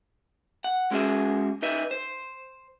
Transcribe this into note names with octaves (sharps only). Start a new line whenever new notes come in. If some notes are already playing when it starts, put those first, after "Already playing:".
F#5
G#3 C#4 F#4 G#4 E5
D#4 B4 D#5 E5
C5